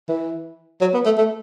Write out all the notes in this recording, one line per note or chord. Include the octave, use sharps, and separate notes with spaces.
E3
F#3
B3
A3
A3